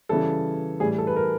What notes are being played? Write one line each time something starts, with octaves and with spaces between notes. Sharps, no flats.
C#3 E3 G3 A4
A2 E3 G3 G#4
A4
B4
A#4